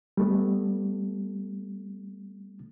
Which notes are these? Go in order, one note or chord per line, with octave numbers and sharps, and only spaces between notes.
G3 A3 B3